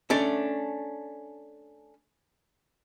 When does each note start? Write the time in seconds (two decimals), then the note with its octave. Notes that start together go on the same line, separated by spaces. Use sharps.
0.10 A3 C#4 D4